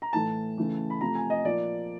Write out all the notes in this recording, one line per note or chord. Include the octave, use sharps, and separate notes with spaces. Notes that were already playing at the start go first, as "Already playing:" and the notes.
A#5
A2 E3 A3 A5
C#3 E3 A3
B5
C3 F3 A3 A#5
G#5
D#5
A#2 F3 A#3 D5